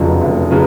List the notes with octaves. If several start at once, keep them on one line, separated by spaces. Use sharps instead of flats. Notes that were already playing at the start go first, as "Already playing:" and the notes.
Already playing: F1 F2 C#3 F#3 B3
F1
C#3 F#3 B3